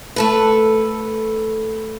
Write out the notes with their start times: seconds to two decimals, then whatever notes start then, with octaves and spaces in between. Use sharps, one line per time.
0.16 A3 A4 B4